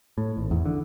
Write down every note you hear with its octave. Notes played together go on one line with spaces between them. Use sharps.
A2
G#1
E2
D3